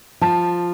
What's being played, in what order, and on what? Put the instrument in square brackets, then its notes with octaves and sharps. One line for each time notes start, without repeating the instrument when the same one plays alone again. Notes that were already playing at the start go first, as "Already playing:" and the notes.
[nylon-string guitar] F3 [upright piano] A5